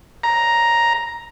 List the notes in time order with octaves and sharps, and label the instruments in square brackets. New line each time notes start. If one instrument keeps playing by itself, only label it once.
[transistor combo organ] A#5